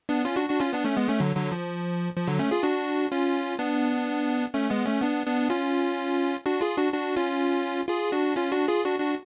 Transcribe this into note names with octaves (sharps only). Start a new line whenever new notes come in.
B3 D4
C#4 F4
D4 F#4
D4 F#4
C#4 F4
B3 D4
A3 C#4
G#3 B3
A3 C#4
D3 F#3
D3 F#3
F3
F3
D3 F#3
A3 C#4
F4 G#4
D4 F#4
C#4 F4
B3 D4
A3 C#4
G#3 B3
A3 C#4
B3 D4
B3 D4
C#4 F4
D4 F#4
F4 G#4
D4 F#4
D4 F#4
C#4 F4
F4 G#4
D4 F#4
C#4 F4
D4 F#4
F4 G#4
D4 F#4
D4 F#4